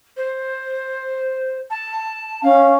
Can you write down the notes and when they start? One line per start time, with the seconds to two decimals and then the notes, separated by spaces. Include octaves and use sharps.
0.16 C5
1.70 A5
2.43 C#4 F5